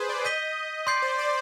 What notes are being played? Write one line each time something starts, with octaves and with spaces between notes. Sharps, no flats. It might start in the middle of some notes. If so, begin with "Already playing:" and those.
Already playing: G#4 B4 C5
D5
D#5 G6 B6 D#7 G7
D5 C6 G6 C7
C5
D5